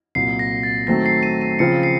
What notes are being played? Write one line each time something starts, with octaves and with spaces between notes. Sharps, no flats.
C2 A#2 F#3 C7
A#6
A6
D#3 F#3 A3 C4 A#6
C7
D#7
D#7
C#3 F3 C4 F4 C#7
C7